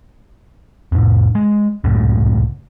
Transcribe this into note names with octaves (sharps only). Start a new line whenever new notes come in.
F2 A2
G#3
C#2 F#2 A2